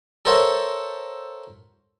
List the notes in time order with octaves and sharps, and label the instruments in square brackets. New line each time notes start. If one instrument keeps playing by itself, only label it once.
[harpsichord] A4 A#4 C5 C#5 E5 F#5